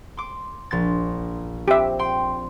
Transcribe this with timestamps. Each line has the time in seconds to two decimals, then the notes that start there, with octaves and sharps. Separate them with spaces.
0.17 C6 D6
0.71 A#1 C6 A6
1.68 C4 G4 E5
1.99 G5 C6